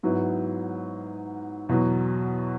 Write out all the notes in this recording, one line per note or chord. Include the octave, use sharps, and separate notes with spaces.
G#2 F#3 B3 E4
E2 B2 F#3